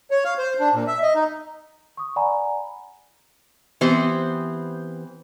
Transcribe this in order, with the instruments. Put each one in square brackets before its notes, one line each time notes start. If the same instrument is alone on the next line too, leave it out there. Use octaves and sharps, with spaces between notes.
[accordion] C#5
F5
C5
D4
A#2
E5
D#5
D#4
[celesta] C#6 D#6
D5 F#5 G#5 A#5 B5
[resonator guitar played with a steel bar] E3 B3 C4 G4 C5